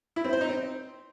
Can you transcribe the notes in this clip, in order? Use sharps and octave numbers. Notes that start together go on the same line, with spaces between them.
E4
C4
C5
D#4
C4